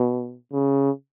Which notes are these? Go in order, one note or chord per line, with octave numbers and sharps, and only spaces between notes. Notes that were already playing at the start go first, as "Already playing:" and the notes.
Already playing: B2
C#3